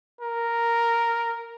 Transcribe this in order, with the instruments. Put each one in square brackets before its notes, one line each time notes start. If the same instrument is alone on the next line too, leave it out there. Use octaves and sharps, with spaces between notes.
[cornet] A#4